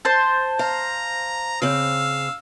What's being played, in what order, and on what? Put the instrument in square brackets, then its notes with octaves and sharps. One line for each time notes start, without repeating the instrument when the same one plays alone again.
[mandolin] C5 A5
[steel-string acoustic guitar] F5 [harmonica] A#5
[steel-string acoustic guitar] C#3 C4 [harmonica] F5 E6